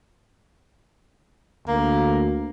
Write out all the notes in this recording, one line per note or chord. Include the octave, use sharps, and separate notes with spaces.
D2 A#3